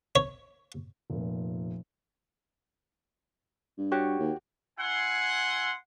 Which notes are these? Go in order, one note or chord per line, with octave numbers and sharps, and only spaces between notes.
C#5
F1 A#2
G2
F#4 G4 C#5
D#2
E4 F#5 G#5 C6